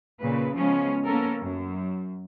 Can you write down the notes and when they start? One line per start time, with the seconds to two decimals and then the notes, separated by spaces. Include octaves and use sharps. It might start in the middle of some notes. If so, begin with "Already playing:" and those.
0.21 A#2 C#3 B4
0.55 C#3 F3 G#3 B3 C#4
1.05 A#3 B3 C#4 A4 A#4
1.39 F#2